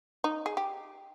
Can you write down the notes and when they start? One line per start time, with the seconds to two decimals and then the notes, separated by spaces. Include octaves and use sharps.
0.24 D#4
0.46 G#4
0.57 G4